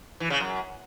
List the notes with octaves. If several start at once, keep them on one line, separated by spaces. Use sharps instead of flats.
E3
C#3
F#2